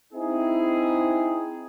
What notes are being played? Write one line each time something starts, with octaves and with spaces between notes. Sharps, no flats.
C4 D#4 E4 G#4